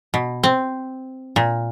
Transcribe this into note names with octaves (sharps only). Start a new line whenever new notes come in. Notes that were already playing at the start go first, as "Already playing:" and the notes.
B2
C4
A#2